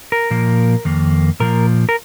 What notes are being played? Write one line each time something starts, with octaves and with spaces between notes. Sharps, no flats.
A#4
A#2 F3 A#3
F2 D#3 A#3
A#2 F3 A#3 A#4
A#4